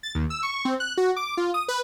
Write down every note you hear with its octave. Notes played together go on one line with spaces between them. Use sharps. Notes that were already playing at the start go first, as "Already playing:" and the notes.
A6
D#2
E6
C#6
C4
F#6
F#4
D6
F4
D#6
B4